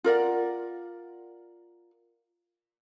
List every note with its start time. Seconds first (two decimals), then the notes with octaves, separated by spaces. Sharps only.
0.04 F4 A#4 D5 F#5